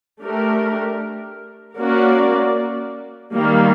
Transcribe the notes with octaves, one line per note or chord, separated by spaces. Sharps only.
A3 D4 G4 A#4
A#3 C#4 F#4 A#4 D5
D#3 G3 A#3